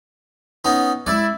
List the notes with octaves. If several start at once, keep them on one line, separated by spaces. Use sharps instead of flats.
B3 C#4 D#4
G#3 C#4 E4 D5